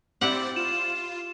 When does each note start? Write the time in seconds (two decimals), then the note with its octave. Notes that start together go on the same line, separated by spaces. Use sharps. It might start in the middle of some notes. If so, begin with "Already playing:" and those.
0.21 C4 E4 G4 D5 F#5
0.56 F4 E7